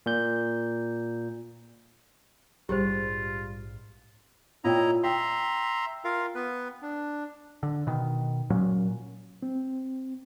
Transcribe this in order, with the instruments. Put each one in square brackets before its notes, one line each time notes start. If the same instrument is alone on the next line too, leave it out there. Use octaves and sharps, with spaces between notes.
[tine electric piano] A#2 G6
[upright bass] A#1 G#2 [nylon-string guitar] G3 [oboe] F4 [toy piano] G4 G#4 C5
[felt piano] A#2 C#5 G5 [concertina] E4 D#5 A#5
[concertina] E5 A#5 C6 [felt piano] G5
[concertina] F4 A#4 F5
B3 B4
D4
[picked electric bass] D3
B2 D#3
A#2 F#3 C#4
[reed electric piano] C4